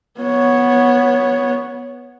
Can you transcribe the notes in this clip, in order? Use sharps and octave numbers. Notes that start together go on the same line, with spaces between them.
B3 C#5